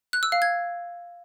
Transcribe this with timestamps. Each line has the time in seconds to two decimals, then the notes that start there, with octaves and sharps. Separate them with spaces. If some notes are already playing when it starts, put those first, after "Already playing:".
0.13 F#6
0.23 E6
0.32 F5
0.42 G#6